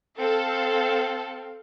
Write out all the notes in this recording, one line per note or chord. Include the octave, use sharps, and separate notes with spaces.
C4 A4 F5